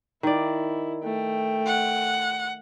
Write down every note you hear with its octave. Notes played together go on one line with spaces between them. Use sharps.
D#3 E4 D5
A3 G5
F#5